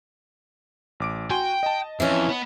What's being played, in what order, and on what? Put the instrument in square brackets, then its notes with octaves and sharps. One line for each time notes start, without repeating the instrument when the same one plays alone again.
[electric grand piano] A1 D6 D7
[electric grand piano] F#4 G#5 C6 [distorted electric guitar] G5
[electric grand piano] D#5 A5
[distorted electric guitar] F2 [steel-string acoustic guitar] E3 C#4
[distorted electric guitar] B3